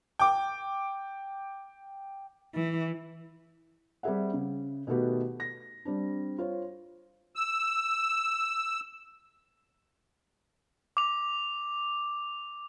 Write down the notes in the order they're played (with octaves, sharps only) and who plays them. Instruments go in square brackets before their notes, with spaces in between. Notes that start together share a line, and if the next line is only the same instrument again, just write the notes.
[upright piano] G5 D6
[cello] E3
[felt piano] G3 C4 G4 G#4 E5 F#5
C#3
B2 D#3 A3 B3 F#4 G4
A#6
G3 C4 D4
F4 C5 C#5
[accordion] E6
[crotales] D6 F7